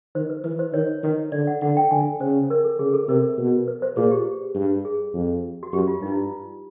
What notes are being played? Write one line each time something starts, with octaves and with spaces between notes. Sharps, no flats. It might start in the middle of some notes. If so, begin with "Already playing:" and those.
D#3 C5
B4
E3 B4
C5
D#3 C#5
D#3
D3 D5
F#5
D3 F#5
G5
D3 G#5
G5
C#3 C5
A#4
A4
C#3 G#4
A4
C3 A#4
B2
B4
C5
A#2 G#4
G4
G2
G#4
F2
F#4
F#2 G4
F4
G2 D#4
E4
F4